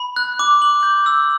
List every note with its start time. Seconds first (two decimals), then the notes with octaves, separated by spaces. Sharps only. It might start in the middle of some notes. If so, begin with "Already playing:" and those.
Already playing: B5
0.16 F#6
0.39 D6
0.62 F#7
0.83 G6
1.06 E6